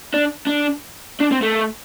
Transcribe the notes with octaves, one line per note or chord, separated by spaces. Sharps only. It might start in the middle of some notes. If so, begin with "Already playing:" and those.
D4
D4
D4
C4
A3